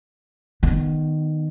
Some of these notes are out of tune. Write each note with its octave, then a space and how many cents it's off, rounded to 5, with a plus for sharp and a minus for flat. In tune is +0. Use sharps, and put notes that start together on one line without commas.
D#3 -15 B3 +0